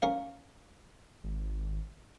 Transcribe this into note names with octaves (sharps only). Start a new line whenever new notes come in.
C#4 A#4 F5
G#1